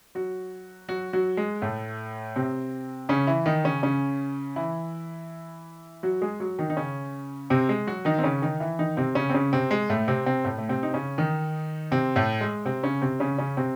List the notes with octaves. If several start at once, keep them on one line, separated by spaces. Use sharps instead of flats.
F#3 F#4
F#3 F#4
F#3 F#4
G#3
A2 A3
C3 C4
C#3 C#4
E3 E4
D#3 D#4
C#3 C#4
C#3 C#4
E3 E4
F#3 F#4
G#3 G#4
F#3 F#4
D#3 D#4
D#4
C#3 C#4
C3 C4
G#3
F#3 F#4
D#3 D#4
C4
C#3 C#4
D#3 D#4
E3 E4
D#3 D#4
C3 C4
C#3 C#4
C4
C#3 C#4
C3 C4
G#3
A2 A3
C3 C4
C3 C4
A2 A3
A3
C3 C4
D#4
C#3 C#4
D#3 D#4
C3 C4
A2 A3
G#3
C3 C4
C#3 C#4
C3 C4
C#3 C#4
C#3 C#4
C3 C4